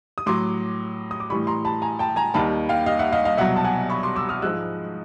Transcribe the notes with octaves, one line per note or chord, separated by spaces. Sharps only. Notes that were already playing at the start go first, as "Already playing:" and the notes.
D#6
A2 F#3 C6 D6
D#6
D6
A2 E3 G3 B5 C#6
A#5 C6
A5 B5
G#5 A#5
G5 A5
G#5 A#5
D#2 D#3 G3 A5 B5
F5 G5
D#5 F5
E5 F#5
D#5 F5
D#5 F5
C2 B2 F#3 E5 F#5
A5
F#5 G#5
B5 C#6
C6 D6
D6 E6
D#6 F6
G#2 F3 G#3 E6 F#6